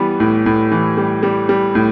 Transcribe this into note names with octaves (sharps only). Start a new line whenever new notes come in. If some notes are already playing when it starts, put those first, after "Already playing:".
Already playing: E3 G3 B3
A2
A2
E3
G3
G3
G3
A2